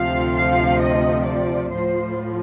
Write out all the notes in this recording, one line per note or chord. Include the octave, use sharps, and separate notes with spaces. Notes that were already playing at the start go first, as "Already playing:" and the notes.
Already playing: D2 C3 F3 F5
F5
D#5
D5
A2 F3 C5